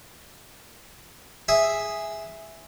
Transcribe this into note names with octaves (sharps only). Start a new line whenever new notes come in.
G#4 E5